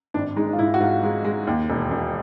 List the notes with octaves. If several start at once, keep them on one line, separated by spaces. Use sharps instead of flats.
G#1 D4
G#3 D#4
F4
G#2 E4
F#4
G#2 F4
G#3
G#3
D#2
E1
E1